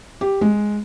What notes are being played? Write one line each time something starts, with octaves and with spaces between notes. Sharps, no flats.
G4
G#3